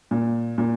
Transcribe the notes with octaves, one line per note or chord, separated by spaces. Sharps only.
A#2
A#2